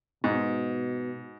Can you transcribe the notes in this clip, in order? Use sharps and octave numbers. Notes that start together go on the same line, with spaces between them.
G#2 B2